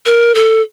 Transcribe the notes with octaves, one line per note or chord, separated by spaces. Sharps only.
A#4
A4